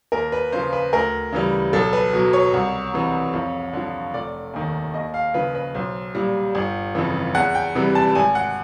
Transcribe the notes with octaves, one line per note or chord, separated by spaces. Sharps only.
D#2 A#4
B4
C#3 F3 C5
B4
D2 A#4
C#3 E3 G3
B1 A4
B4
B2 F#3
C#5
C2
C3 E3
F2
D3 F3
F1 D5
D#2 D#3
D#2 D#5
F5
C#3 F3 B4
B4
B1 C5
A#2 G3
G1
F2 C#3 E3
E2 F#5
G5
C3 E3 G3
A5
G#1 G#5
F#5